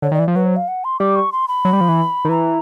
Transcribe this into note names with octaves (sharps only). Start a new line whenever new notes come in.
D3 C#5
D#3 D5
E3
F3
F#3 B4
C5
F5
F#5
C6
G3 D6
C#6
C6
B5
F#3
G3
F3
E3
D#3
E3 A#5